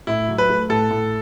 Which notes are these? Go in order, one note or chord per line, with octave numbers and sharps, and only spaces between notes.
A2 E4
F#3
B4
A3
A2 A4
A2